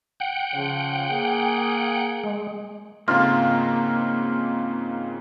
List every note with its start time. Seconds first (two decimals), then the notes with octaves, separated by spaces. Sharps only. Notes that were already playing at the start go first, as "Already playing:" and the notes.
0.20 F#5 G5
0.53 C#3 F3
1.10 A#3 G#4
2.24 G#3
3.08 G#2 C#3 A#3 C4 F4